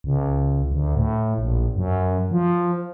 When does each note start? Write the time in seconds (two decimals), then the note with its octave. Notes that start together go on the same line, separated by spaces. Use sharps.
0.04 C#2
0.71 D2
0.96 A2
1.38 A#1
1.76 F#2
2.31 F3